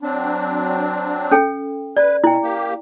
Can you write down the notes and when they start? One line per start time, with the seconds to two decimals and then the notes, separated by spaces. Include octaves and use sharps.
0.01 F#3 C4 D4
1.31 C#4 A4 G5
1.97 B4 D5
2.24 B2 E4 G5
2.43 A#3 G4